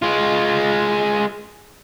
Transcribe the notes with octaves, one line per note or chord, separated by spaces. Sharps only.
G#3 F4